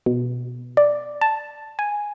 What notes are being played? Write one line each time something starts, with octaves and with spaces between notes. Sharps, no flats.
B2
D5
A5
G#5